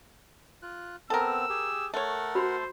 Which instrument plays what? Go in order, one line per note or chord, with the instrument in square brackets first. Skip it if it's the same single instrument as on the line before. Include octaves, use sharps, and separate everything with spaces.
[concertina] F4 F#6
[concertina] B3 C4 [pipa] A4 A#4 [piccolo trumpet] E6
[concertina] G4 G#4
[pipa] A3 C#5 [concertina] A#4 F#5
[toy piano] F#4 B5 C6 [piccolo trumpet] C5